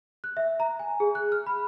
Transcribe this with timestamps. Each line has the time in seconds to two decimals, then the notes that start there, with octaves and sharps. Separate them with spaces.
0.24 F#6
0.37 E5
0.60 A#5
0.79 G#5
1.00 G#4
1.15 F#6
1.32 F6
1.46 B5